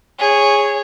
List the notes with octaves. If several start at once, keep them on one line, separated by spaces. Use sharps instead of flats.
G#4 C#5